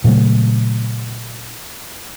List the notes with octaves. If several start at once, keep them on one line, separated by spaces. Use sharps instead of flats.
A#2 C#3 F#3 A3